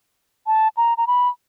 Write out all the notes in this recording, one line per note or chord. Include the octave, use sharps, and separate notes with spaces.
A5
A#5
A#5
B5